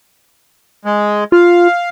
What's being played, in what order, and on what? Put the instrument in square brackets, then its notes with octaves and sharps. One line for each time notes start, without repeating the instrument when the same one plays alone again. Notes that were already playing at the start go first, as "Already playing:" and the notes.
[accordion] G#3
[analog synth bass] F4 [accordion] F5